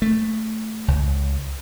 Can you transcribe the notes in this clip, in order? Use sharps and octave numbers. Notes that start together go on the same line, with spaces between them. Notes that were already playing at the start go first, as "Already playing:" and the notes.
A3
C#2